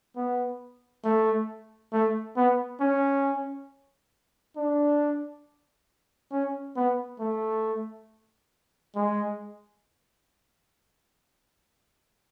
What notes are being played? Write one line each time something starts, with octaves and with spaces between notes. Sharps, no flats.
B3
A3
A3
B3
C#4
D4
C#4
B3
A3
G#3